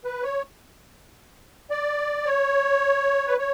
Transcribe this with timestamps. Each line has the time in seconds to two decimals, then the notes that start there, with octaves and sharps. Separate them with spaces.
0.05 B4
0.23 C#5
1.70 D5
2.26 C#5
3.28 B4
3.38 C#5